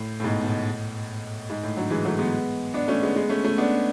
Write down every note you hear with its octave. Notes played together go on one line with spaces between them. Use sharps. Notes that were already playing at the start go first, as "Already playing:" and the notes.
Already playing: A2
A2
G#2 B2
B2
A2
G#2
A2
D3 F#3
E3 G#3
F#3 A3
G#3 B3
B3 D4
A3 C#4
G#3 B3
G#3 B3
A3 C#4
A3 C#4
B3 D4